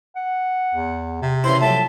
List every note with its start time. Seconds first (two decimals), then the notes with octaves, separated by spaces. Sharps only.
0.16 F#5
0.75 E2
1.22 C3
1.44 C#3 E3 E4 C5 C6
1.61 A2 F3 F#3 E5 A5